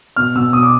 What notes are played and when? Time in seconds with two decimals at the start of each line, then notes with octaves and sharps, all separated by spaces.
0.16 B2 F6
0.35 B2 E6
0.53 B2 D#6
0.63 D6